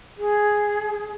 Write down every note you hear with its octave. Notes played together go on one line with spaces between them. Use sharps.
G#4